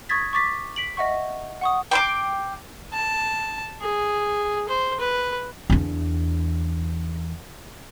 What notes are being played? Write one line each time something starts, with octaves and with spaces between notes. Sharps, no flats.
C#6 D#6 G#6 A6 B6
C#6 D6 A6 B6
B6 D7 F#7
D#5 E5 F#5 C#6
F#5 C#6 D#6
G5 C6 D6
A5
G#4
C5
B4
E2 D4